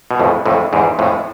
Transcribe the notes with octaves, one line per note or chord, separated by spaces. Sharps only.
B2
F2 A2
F2 A2
E2 G#2
F2 A2